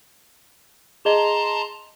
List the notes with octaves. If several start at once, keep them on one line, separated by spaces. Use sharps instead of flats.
G#4 D#5 A5 A#5 C6 G7